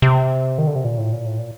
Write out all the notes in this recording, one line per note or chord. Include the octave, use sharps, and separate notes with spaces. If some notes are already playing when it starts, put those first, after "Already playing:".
C3
D#3
D3
C3
A#2
A2
A#2
A2
A#2